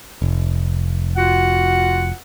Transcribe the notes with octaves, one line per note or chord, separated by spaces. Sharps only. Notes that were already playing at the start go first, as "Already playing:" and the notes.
F1
F4 F#4 F#5